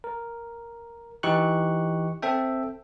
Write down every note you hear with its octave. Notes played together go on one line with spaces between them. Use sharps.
A#4
E3 D#4 G4 C#6 F#6
C4 A4 E5 G5